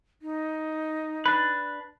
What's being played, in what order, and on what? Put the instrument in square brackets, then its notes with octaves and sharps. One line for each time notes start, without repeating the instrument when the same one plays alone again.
[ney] D#4
[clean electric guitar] D4 B4